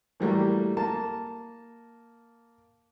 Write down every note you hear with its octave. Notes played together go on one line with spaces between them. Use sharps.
A2 E3 F#3 G3 A3 A#3
A#3 A5